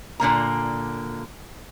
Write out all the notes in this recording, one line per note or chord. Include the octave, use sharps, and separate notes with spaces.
A#2 D3 A#3 A#5